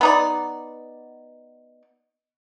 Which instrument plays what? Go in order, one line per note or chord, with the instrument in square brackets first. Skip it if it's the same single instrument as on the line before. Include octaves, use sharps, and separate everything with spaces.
[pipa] B3 D#4 D5